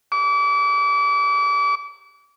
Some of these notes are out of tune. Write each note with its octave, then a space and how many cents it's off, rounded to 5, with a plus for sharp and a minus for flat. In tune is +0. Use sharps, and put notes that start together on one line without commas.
D6 -35